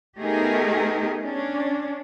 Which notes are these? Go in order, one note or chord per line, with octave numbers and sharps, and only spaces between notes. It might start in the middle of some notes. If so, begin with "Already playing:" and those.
A3 B3 D#4 G4 G#4 A#4
C#4 D4